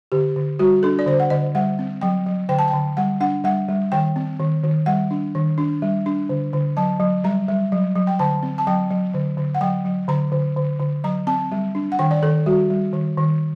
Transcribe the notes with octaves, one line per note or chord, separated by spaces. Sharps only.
D3 G4
D3
G3 F#4
D4 A4
D5
D3 C5
F#5
D3 D#5
G3 F#5
C4
F#3 G5
F#3
D3 G5
A5
G5
D3
G3 F#5
D4 F#5
G3 F#5
G3
D#3 G5
C4
D#3
D#3
G3 F#5
D4
D#3
D4
G3
D4
D3
D3
F#3 A5
F#3
G3 A#5
G3
F#3
F#3
G5
D3 A5
C4
A5
F#3 G5
F#3
D3
D3
F#5
F#3 G5
F#3
D3 A#5
D3
D3
D3
F#3 A#5
C4 A5
G3
D4
F#5
D#3 G5
D5
D#3 A4
G3 F#4
G3
D#3
D#3